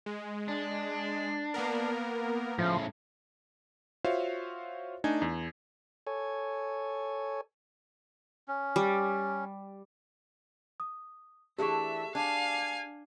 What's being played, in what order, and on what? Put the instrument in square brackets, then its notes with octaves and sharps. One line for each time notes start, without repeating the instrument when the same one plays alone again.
[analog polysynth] G#3
[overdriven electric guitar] D4
[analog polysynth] A#3 B3 A#4
[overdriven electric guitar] A2 C#3 [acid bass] F3
[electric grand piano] F4 F#4 C5 C#5 E5 F5
A3 D4 D#4 G#5 G#6
E2
[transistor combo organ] A4 C#5 G#5
[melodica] C#4
[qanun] G3
[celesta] D#6
[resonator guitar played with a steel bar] E3 A3 D4 [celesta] G4 G#4 C#6 [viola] E5
[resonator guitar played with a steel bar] D4 [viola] F5 G#5